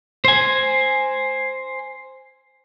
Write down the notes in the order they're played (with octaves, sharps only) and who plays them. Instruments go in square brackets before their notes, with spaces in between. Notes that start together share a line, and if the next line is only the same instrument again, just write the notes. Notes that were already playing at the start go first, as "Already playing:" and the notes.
[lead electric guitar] C5 G#5